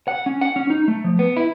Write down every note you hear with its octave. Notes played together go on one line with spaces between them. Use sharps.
F#5
C#4
F#5
C#4
D#4
A3
F3
B3
E4